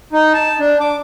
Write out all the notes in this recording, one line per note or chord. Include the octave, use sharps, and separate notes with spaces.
D#4
A5
D4
D6